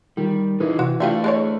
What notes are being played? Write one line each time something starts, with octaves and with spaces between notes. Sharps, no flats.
D#3 G3
E3 D#4 F4
C3 F#4
A3 D4 F4 G4 E5
G#3 A4 C#5